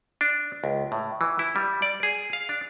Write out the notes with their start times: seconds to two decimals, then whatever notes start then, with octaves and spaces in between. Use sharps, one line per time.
0.21 D4
0.64 C#2
0.92 A2
1.21 E3
1.39 E4
1.56 G3
1.82 D5
2.03 G#4
2.33 F5
2.49 D4